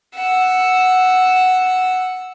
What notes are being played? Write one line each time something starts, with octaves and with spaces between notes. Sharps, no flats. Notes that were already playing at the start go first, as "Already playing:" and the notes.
F#5 E6